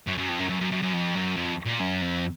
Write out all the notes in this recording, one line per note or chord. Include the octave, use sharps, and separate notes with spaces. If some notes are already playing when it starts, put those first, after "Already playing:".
F#2
F#2
F2
F#2
F#2
F#2
F#2
F#2
F2
F#2
F2
A#2
F#2
F2